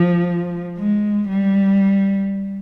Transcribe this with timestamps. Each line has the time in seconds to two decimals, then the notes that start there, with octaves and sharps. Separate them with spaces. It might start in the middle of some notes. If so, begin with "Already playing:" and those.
Already playing: F3
0.78 G#3
1.29 G3